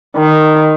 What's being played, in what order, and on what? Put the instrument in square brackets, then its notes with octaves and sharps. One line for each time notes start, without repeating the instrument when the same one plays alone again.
[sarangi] D#3